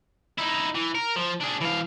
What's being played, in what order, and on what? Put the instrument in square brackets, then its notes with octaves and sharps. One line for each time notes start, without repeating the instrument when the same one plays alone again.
[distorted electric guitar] D#4 E4
E3
A#4
F3
D4 G#4
E3 F5